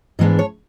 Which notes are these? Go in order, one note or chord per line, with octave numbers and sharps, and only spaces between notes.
G#2 E3 G#3 B3 D4 D#5
C#5